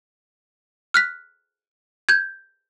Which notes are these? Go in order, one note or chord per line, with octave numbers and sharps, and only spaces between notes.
F6 F#6 B6
G6 G#6